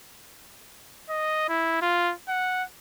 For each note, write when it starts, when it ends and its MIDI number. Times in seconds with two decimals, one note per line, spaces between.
1.10 1.48 75
1.49 1.77 64
1.82 2.14 65
2.29 2.63 78